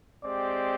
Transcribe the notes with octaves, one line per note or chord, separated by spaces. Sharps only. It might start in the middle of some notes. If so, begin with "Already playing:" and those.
G#3 C4 G4 D5